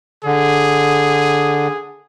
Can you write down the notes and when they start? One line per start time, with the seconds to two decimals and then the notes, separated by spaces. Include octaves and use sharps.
0.25 D3 G#4